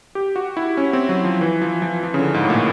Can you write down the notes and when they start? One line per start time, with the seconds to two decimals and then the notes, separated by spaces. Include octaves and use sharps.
0.15 G4
0.36 F#4
0.57 E4
0.77 C#4
0.93 C4
1.09 F#3
1.24 F3
1.41 E3
1.62 F3
1.82 F3
2.03 F3
2.14 C#3
2.19 D3
2.34 G#2
2.44 A2
2.50 A#2